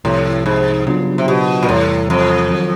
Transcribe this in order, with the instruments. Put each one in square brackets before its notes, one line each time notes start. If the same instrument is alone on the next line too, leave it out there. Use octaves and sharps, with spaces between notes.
[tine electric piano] C2 C3 F3 [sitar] A2
[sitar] G#2
[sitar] G2 [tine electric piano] C#3 F#3 B3 D4 F4
[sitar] C3
B2
A#2
[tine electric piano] E2 C3 E3 G3 [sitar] A2
[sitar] F2
[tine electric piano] D#3 F#3